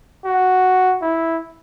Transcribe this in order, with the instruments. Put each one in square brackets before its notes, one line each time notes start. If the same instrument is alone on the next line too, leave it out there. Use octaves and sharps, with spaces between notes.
[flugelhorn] F#4
E4